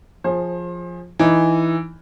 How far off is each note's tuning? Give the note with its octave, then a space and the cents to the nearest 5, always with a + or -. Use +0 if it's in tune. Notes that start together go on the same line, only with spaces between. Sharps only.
F3 +5 G#4 +0 C5 +30
E3 +0 D#4 +0